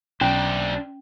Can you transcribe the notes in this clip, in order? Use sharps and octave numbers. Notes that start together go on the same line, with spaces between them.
B1 C#4 D4 C5